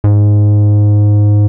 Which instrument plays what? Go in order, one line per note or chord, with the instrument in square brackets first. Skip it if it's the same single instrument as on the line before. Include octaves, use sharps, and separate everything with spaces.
[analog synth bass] G#2